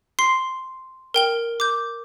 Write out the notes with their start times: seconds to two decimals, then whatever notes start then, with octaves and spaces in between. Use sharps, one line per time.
0.19 C6 C7
1.14 A#4 G5 G7
1.60 D6 G6